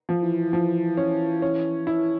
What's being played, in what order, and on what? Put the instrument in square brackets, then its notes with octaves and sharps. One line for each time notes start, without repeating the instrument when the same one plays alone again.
[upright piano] F3
[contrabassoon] E3
[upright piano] F3
C#4
C#4
E4